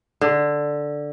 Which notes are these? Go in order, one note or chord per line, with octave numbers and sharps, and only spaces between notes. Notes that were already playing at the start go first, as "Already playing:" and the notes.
D3